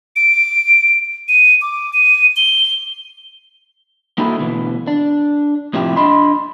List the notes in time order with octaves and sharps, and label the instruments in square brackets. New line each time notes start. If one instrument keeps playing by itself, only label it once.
[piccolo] D7
D#7
D6
D#7
G7
[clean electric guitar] A#3 D#4 E4 F#4 A4
D2 B2 E3
D4
A2 C3 F3 E4 G4
D4 D#5 B5 C6